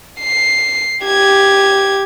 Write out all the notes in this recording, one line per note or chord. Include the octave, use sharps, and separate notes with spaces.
C7
G4 G#6